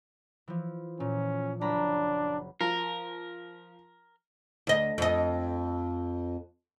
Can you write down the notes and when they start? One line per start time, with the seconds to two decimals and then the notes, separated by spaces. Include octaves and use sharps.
0.48 E3 F3
1.00 A#2 C#4
1.61 F#1 D4 A#5 B5
2.61 F3 A#4
4.67 D2 D#5
4.98 F2 D#5